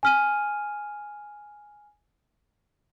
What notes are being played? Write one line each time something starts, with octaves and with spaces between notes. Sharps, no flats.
G#5 F6 D#7